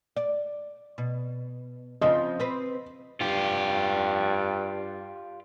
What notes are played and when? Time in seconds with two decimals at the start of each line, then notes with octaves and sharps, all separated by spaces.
0.16 D5
0.98 B2
2.01 C#3 F3 C4 D#5
2.40 C4 B4
3.21 G2 F4 G4